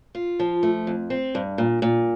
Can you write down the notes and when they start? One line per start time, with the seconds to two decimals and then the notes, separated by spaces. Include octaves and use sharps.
0.15 F4
0.40 F3
0.63 A3
0.87 F2
1.10 C4
1.35 G2
1.58 A#2
1.82 A#2